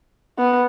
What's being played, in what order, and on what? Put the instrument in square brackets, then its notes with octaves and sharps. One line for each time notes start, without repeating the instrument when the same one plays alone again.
[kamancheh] B3